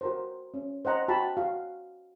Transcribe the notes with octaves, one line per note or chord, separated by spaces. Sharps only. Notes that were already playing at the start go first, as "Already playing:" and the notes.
F#4 A#4 C5
C#4
C5 D#5 F#5 A#5
F#4 G5 A5 B5
F#4 F5